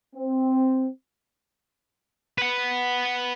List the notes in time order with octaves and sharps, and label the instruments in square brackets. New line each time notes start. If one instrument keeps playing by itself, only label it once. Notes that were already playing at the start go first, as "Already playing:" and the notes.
[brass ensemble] C4
[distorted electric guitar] B4 F#5